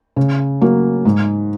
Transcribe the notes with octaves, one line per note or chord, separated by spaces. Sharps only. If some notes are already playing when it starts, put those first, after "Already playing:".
C#3
F#3 A#3
G#2